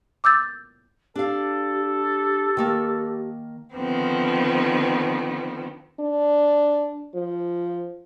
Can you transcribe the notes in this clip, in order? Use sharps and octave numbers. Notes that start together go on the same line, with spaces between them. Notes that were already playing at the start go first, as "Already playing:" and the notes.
D6 E6 G6 A6
D4 G4 A4 F5
D#3 A#3 A5
D3 D#3 F3 B3 C4
D4
F3